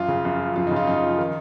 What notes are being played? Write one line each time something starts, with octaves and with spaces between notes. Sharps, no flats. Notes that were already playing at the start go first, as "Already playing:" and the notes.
Already playing: F#2 F4
C#3
F#2
F3
F#2 F4
C#3 D#4
F4
F#2 D#4
F3
D#3